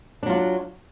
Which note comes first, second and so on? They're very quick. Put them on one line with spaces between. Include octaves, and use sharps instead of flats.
D4 F#3 F4